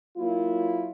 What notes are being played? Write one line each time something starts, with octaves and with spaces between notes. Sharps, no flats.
F#3 A#3 E4 F4